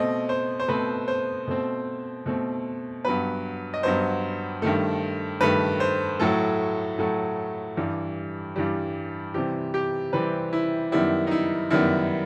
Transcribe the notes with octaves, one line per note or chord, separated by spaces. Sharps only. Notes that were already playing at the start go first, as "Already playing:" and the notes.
Already playing: B2 A3 C4 D#5
C5
C5
B2 A3 C4 B4
C5
B2 A3 C4
B2 A3 C4
G2 F#3 B3 B4
D#5
G2 F#3 B3 C5
G2 D#3 A3
G2 D#3 A3 B4
C5
A2 F#3 A3 A4
A2 F#3 A3
G2 E3 G3
G2 E3 G3
C3 E3 G3 C4 G4
G4
C3 E3 G3 C4 B4
E4
F#2 D#3 G3 B3 E4
D#4
E4
F#2 D#3 G3 B3 E4